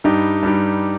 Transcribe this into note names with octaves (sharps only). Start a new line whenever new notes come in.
G2 G3 D#4 G4
G2 G3 D#4 G4